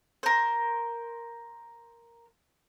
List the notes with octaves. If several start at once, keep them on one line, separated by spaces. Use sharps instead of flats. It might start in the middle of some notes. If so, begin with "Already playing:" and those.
A#4 C5